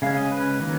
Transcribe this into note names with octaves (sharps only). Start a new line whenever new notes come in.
C#3 G#3 C#4 F5
D#5
B4
D#3 F#3 A#3 C#4